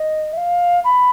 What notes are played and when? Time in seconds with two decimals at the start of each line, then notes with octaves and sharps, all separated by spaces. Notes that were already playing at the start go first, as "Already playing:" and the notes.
Already playing: D#5
0.33 E5
0.37 F5
0.84 B5